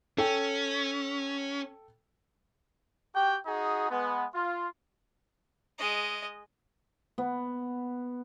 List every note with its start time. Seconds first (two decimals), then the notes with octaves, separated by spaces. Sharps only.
0.18 C#4 A4 G5
3.14 F#4 G4 G5
3.46 D#4 F#4 G#4
3.91 G#3 B3
4.34 F4
5.78 G#3 D#5
7.18 B3